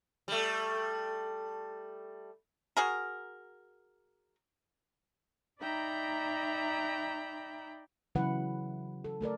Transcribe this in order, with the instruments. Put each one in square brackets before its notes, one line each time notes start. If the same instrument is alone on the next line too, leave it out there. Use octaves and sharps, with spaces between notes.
[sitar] G3 A3
[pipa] F#4 G#4 A#4
[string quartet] D#4 D5 E5 G5 A#5 B5
[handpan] C#3 E3 F#3 E4 B4 F#5
A4
A3 A4 A#4 D5